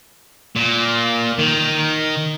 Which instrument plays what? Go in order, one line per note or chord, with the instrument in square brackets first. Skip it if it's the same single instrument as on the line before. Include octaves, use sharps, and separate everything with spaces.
[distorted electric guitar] A#2
D#3